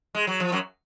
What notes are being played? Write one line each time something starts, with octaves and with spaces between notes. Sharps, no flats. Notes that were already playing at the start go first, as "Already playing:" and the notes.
G#3
F#3
F3
F#2 F#3